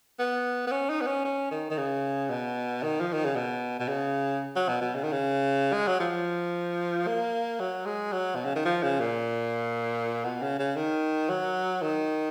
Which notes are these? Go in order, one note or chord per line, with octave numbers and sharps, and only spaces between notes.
B3
B3
C#4
D#4
B3
C#4
C#4
D#3
D#3
C#3
B2
D#3
F3
D#3
C#3
B2
B2
C#3
F#3
B2
B2
C#3
D#3
C#3
G#3
F#3
F3
A#3
F#3
G#3
F#3
B2
C#3
D#3
F3
C#3
A#2
B2
C#3
C#3
D#3
F#3
D#3